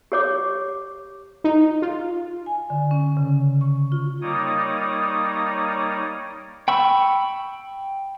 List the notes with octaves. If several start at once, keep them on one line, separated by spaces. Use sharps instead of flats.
G4 C#5 D6
D#4
F4
G#5
D3
C#4
C#3
C#6
F4
G3 A#3 D#4 C#5 D5 D#6
G5 B5 C#6 E6